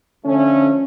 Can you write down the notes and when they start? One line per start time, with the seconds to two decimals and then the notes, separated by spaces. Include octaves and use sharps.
0.25 D3 F3 A3 C#4